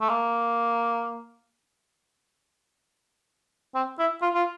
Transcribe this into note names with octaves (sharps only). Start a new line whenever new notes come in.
A3
A#3
C4
E4
F4
F4